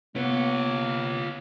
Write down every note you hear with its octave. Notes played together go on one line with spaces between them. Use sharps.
C3 A#3 B3 F4 C#5